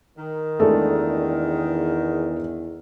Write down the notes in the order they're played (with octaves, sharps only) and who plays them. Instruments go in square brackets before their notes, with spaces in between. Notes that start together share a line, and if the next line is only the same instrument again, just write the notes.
[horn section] D#3
[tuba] E2 [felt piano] G#3 D4 A4 [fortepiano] A3